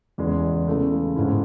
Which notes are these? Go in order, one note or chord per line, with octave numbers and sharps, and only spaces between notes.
E2 C#3 G#3
C#3 E3 A3
G#2 G#3 C#4 E4